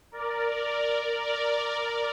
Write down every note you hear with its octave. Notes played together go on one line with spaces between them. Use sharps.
A#4 D5
A#4 D5
A#4 D5